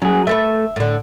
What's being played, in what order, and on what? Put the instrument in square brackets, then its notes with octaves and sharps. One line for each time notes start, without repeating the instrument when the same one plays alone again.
[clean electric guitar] F#2 G#4 [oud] F#3
[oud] A3 A4 B4 [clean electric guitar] E5
[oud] A2 D3